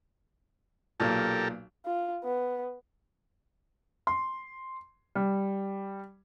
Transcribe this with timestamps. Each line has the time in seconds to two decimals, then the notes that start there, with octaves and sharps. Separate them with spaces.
1.00 B1 A#2 G4 A4 A#4 A5
1.86 F4
2.24 B3
4.07 C6
5.15 G3